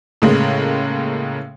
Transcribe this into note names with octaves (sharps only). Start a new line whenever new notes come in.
A2 C#3 G#3 A#3